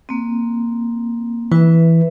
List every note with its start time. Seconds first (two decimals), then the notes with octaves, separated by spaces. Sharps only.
0.09 A#3 C4
1.52 E3 B4 E5